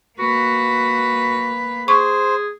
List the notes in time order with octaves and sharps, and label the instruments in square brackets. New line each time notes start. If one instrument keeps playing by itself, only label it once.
[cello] A#3 B4 [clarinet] F#4
[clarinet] G#4 [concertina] C5 [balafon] C#6